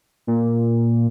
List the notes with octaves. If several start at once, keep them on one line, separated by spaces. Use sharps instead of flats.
A#2